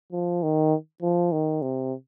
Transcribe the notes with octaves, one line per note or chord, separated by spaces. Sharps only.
F3
D#3
F3
D#3
C3